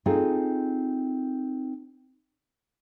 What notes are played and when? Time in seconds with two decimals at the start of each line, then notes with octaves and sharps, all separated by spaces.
0.06 C4 D#4 F4 G#4 A4